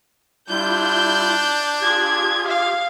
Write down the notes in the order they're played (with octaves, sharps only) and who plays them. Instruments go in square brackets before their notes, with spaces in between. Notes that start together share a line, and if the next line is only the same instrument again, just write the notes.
[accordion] G3 E4 F4 [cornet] D4 [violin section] G6
[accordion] F4 G4 G#4 [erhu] G#6
[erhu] F5